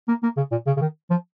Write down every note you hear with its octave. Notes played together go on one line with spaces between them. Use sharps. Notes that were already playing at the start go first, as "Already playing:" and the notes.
A#3
A#3
C#3
A#2
C#3
C#3
D#3
F3